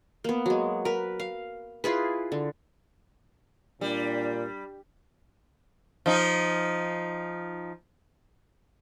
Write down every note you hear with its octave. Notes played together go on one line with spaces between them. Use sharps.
A#3 B3
F#3 G#3
A#4 B4
F5
E4 F4 G#4 B4
D3
A#2 G3 D4
F3 D#4